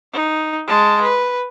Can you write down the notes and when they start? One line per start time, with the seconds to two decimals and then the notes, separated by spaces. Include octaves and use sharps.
0.13 D#4
0.67 G#3 A5
1.02 B4